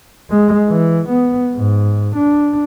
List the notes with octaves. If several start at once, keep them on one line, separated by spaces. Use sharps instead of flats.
G#3
E3
B3
G#2
D4